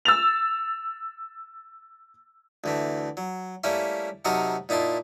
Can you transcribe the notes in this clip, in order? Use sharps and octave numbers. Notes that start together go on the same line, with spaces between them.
E6 A6 F7
D2 E3 A3
F#3
G3 A3 A#3 C#4 E4
C3 F#3 D#4 F#4 A4 A#4
A#2 D#4 E4 A5 C6